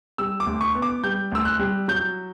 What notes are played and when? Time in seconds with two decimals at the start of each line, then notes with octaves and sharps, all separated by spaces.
0.18 G3 E6
0.40 D6
0.46 D2
0.61 C#6
0.75 B3
0.82 D6
1.04 G3 G6
1.32 D2 E6
1.45 F#6
1.59 G3
1.88 F#3 G6